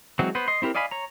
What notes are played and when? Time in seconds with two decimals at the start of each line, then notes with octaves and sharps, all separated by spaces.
0.19 E3 F#3 G#3 C4 F#4
0.35 B3 B4 C5
0.48 D#5 C6
0.62 C4 E4 G4 A#4
0.75 D5 D#5 F5 G#5 B5
0.91 C#5 A#5